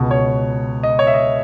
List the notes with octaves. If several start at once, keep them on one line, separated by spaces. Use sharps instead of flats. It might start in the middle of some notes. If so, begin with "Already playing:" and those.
Already playing: C#2 B2
C#5
D#5
C#5
E5
D#5